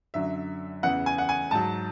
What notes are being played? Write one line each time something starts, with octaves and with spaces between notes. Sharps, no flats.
F#2 D3 F#3 E5
E2 C#3 E3 F#5
G#5
F#5
G#5
G#2 F#3 A5